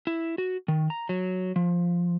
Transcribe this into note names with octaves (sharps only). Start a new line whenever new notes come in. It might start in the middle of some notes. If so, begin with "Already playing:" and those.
E4
F#4
D#3
A#5
F#3
F3